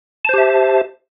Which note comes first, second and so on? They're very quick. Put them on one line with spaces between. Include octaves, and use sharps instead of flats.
A5 C5 G4 E5